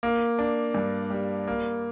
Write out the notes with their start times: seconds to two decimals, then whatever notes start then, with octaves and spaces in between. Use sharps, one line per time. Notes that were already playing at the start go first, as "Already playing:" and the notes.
0.03 A#3
0.39 D4
0.74 G2
1.10 G3
1.48 A#3